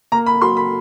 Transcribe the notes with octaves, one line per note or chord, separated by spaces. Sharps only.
A#3 A#5
B5
F#3 C6
B5